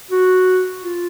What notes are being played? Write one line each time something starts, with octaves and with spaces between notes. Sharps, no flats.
F#4
F4